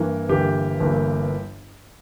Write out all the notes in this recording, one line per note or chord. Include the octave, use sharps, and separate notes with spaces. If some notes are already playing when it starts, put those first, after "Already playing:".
Already playing: G2 E3 A#3
G1 G2 E3 A#3 G4
G1 G2 E3 A#3